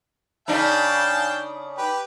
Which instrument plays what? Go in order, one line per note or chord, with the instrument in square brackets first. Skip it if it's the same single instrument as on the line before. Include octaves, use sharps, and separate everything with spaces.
[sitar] C#3 D4 D#4 [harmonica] F5 G5 A5
[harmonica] G4 B4